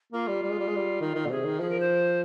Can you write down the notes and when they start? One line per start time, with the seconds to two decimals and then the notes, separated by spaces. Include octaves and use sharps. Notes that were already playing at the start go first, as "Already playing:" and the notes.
0.13 A#3 F4
0.27 G3
0.43 G3
0.50 G#3
0.59 G3
0.67 G#3
0.76 G3
1.01 D#3
1.15 D#3
1.26 A#2
1.30 C3 G#4
1.45 D#3
1.60 F3 G#4
1.70 A#4
1.80 C5